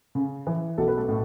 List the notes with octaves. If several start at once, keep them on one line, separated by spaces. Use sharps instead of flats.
C#3
E3
B1 A4
B4
A3 A4
A2